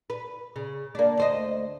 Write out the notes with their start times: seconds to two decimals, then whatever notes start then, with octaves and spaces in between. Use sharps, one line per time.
0.10 B4
0.56 C#3
0.95 A#3 D4
1.17 D2 C5 D#5